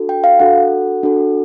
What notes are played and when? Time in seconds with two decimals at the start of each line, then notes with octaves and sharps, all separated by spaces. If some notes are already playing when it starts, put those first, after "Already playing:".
Already playing: D4 F#4 A4
0.09 G5
0.24 F5
0.40 D4 F#4 A4 F#5
1.03 D4 F#4 A4